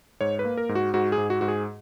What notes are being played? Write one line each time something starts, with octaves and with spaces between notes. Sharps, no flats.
G#2 C#5
B4
A#3
A#4
G#2
F#4
G#2 F#4
G#4
G#2
F#4
G#2 F#4
G#4